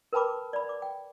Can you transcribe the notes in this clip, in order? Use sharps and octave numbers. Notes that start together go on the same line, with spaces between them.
A#4 B4 G5 A5 B5 D6
D5 B5
D6
G5